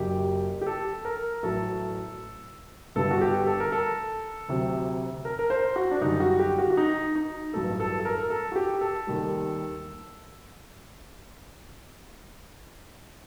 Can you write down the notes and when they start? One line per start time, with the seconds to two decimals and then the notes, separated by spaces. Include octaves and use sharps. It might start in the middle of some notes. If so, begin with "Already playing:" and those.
Already playing: F#1 F#2 F#3 G4
0.61 G4
0.66 A4
1.05 A#4
1.43 A1 A2 F#3 A4
2.95 G1 G2 D3 G3 A4
3.11 F#4
3.21 G4
3.47 A4
3.60 A#4
3.72 A4
4.49 D2 C3 F#3
5.25 A#4
5.39 A#4
5.50 C5
5.76 F#4
5.91 D4
6.01 F#2 D3 G3 D#4
6.20 F#4
6.39 G4
6.58 F#4
6.70 F#4
6.77 D#4
7.16 D#4
7.54 A1 G2 F#3 A4
7.80 A4
8.00 A4
8.05 A#4
8.30 A4
8.52 F#4
8.56 G4
8.81 A4
9.07 D#2 D#3 G3